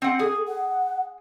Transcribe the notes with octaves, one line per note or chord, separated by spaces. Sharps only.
C4 F#5
G#4 A4
F#5